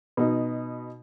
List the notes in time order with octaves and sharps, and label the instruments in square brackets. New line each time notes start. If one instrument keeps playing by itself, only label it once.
[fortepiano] B2 D#4